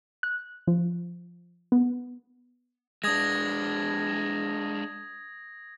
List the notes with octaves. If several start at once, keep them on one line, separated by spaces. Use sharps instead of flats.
F#6
F3
B3
G#3 D4 D#6 G#6 A#6